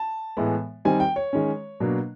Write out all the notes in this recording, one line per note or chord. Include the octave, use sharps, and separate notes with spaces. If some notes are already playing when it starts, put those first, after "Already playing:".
Already playing: A5
A2 E3 G#3 B3
D#3 G3 C4 D#4 G#5
G5
C#5
D#3 G#3 C#4
B2 F#3 A#3 D4